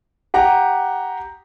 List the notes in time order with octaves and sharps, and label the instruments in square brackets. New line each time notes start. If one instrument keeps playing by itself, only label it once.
[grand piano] G4 F#5 A#5